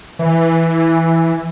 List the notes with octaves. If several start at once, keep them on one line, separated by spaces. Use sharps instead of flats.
E3